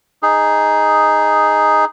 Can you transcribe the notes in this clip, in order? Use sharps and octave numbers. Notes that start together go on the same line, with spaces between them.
D#4 G#4